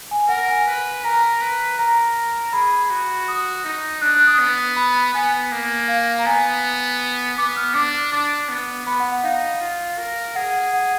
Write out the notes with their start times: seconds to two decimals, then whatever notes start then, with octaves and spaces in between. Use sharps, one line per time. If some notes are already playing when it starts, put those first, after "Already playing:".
0.11 G#5
0.29 A#4 F#5
0.48 G#5
0.67 B4
1.04 A#4 A#5
1.41 B4
1.78 A#4 A#5
2.53 G#4 B5
2.90 F#4
3.28 D#6
3.65 D#4
4.02 D4 F#6
4.15 F#6
4.27 D#6
4.39 B3
4.76 B5
5.14 B3 G#5
5.52 A#3
5.88 F5
6.19 A#5
6.26 B3 G#5
7.38 B3 D6
7.56 F6
7.74 D4 D6
8.12 D4 D6
8.49 B3
8.87 B3 B5
9.00 F#5
9.12 F#5
9.23 D#4 F5
9.61 F4
9.98 A#4
10.35 G#4 F#5
10.73 F#5